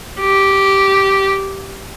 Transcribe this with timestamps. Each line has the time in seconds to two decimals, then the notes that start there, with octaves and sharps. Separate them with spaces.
0.21 G4